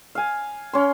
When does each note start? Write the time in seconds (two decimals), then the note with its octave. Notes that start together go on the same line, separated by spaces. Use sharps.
0.15 F5 G#5
0.73 C#4 C6